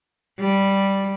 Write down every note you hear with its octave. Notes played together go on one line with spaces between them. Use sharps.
G3